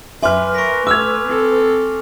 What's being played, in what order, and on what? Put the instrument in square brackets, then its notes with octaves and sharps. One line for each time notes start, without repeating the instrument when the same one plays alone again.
[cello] F#2 [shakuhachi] B4 [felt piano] E5 F6 [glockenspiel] G#5 C6 D6
[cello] A#4 [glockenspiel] C#6 B6
[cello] A3 [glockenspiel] D6 F6 F7 [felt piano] E6 G#6
[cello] C4 A4